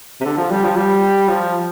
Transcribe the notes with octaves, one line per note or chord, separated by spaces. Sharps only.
C3
D3
F3
G3
F3
G3
F3